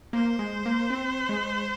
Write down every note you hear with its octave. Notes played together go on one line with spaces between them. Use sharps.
A#3 C5
G#3
A#3
C4
G#3